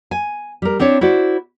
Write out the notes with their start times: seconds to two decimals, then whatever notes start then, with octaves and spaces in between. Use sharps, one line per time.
0.11 G#5
0.62 G3 A#4
0.79 C4 D4 E4 C#5
1.01 E4 F#4 C5 D5